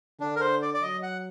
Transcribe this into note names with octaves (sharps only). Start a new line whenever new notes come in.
D3 D4
A#4
C5
D5
D5
F#3 D#5
F#5